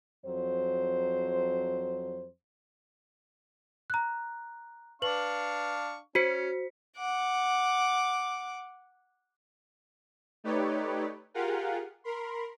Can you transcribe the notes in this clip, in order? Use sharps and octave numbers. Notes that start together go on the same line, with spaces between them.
F2 F#3 C5
A#5 F#6
D4 B4 F5 C#6 F#7
C#4 F#4 C5 B6 C#7
F#5 D6
A3 D#4 G4 B4 C#5 D5
F4 G4 G#4 A#4 F5 F#5
A#4 B5 C6